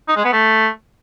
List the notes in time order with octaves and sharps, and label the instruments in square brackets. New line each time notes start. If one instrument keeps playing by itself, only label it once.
[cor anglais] D#4
G#3
B3
A3